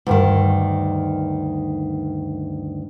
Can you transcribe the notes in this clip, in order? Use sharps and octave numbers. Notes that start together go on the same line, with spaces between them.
D2 G2 D#3